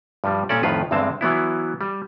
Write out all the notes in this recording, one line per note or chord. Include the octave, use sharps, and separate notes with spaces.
G2 F3 G3
A#2 C#4 A4 D5
F2 A2 D#3 F4 B4
E2 G2 D3 G#3 C4 A5
E3 F#3 B3 E4
G3